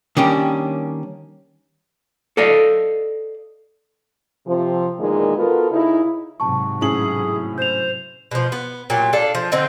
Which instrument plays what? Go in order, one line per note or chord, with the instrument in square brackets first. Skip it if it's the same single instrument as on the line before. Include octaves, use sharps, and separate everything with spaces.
[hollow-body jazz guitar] D#3 G3 A#3 C#4 D4 G4
A4 D5 D#5 F5
[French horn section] C3 F3
E2 A#2 D#3 G#3
B3 F4 F#4 A4 A#4
C#3 D#4 E4
[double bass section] G#2 C3 F#3 [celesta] A5 C#6
[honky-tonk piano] A2 C#4 F#7 [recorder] G#4
[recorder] C5 [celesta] G6 F7
[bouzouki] B2 F3
B3
A#2 F#3 G4
D4 F4 A4
F3
D3 C4 D#4